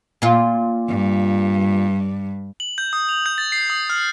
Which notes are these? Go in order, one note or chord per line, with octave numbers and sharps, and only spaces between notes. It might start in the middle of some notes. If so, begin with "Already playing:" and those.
A#2 F4
G2
F#7
G6
D#6
F7
G6
A6
C7
D#6
F6